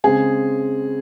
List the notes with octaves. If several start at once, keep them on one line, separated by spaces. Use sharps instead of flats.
C#3 G#3 C4 G#4